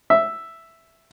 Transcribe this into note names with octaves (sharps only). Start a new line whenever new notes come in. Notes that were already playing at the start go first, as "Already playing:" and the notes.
E5